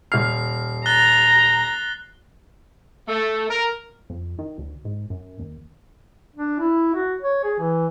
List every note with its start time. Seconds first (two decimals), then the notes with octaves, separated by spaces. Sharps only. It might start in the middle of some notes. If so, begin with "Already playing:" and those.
0.12 D#1 F6 C7
0.86 A#5 F#6 A6 G7
3.09 A3
3.50 A#4
4.10 F2
4.39 D#3
4.58 D2
4.85 G#2
5.10 F#2
5.39 D#2
6.36 D4
6.59 E4
6.94 F#4
7.22 C#5
7.44 G#4
7.59 E3